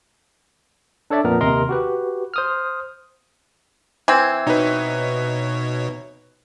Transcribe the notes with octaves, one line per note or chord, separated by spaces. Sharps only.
D4 A4 C#5 D5 E5
F2 A#2 B3 A#4
D#2 C3 A#4 D#5 C6
F#4 G4 B4
C5 D#6 F6
E3 C4 G#6
B2 D#4 B4 C#5